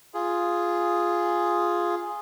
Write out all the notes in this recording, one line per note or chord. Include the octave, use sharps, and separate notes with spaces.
F4 G#4